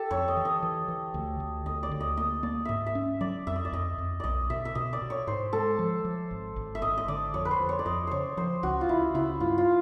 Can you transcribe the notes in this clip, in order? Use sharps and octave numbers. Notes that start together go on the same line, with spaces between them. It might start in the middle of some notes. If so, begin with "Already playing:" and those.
Already playing: G4 A4
F2 C#5
D#5
E3
D#5
E3
E3
D2
D2
D2 D#5
D5
D2
D#5
A#3 D#5
A#3 D5
G#2 D#5 E5
E5
C#4
F#3 D5
F2 E5
D#5
D5
F2 D#5
F2
B1 D5 D#5
B2 E5
E5
B2 D#5
D5
B2
C#5
G#2 C5
G#3 A4
F3
F3
G#1
G#1
E5
G#1 D#5
D#5
D3 D5
F2 C#5
B4
C5
F2
C#5
D5
F2 D#5
C#3 C5 C#5
F3 C5
C#2 F#4
F4
C#2 E4
C#3 E4
G2 F4
F4